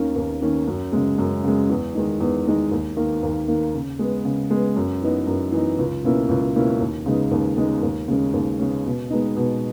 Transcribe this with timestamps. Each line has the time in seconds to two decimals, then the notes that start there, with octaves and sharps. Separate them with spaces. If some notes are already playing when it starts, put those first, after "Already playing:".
Already playing: D#2 D#3 A#3 C#4
0.16 D#2
0.42 D#3 A#3 C#4
0.67 F#2
0.92 C#3 G#3
1.18 F#2
1.43 C#3 G#3
1.69 E2
1.95 D#3 G#3 D#4
2.20 E2
2.46 D#3 G#3 D#4
2.71 D#2
2.96 D#3 A#3
3.23 D#2
3.48 D#3 A#3
3.74 C#3
3.99 G#3 B3
4.25 C#3
4.50 G#3 B3
4.76 F#2
5.02 E3 B3 D#4
5.27 F#2
5.52 E3 B3 D#4
5.78 C#2
6.04 B2 A#3 C#4 E4
6.29 C#2
6.55 B2 A#3 C#4 E4
6.80 D#2
7.06 C#3 G#3 B3 D#4
7.31 D#2
7.57 C#3 G#3 B3 D#4
7.82 D#2
8.08 C#3 G#3 C#4
8.33 D#2
8.59 C#3 G#3 C#4
8.86 B2
9.10 G#3 B3 D#4
9.36 B2